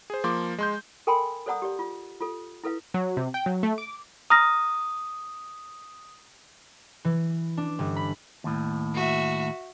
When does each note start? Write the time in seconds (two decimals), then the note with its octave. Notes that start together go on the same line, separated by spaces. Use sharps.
0.10 G#4 C5
0.24 F3 A#3 C6 D6
0.58 G#3 C6 G6
1.07 A4 A#4 G5 G#5 B5 C6
1.46 A4 C5 D5 F#5 A#5 D#6
1.62 G4 D5
1.79 F4
2.21 F4 A4
2.64 E4 A4 B4 F5
2.94 F#3
3.17 C3
3.34 G5
3.46 F#3
3.63 A3
3.78 D6
4.30 A#5 D#6 F6 A#6
7.05 E3
7.57 D4
7.79 G1
7.96 B5
8.44 D#2 A2
8.94 F#4 E5